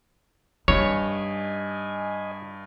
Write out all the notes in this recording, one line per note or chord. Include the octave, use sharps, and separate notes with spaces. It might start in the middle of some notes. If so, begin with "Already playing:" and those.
G2 D#4 C#5 D#5 G#5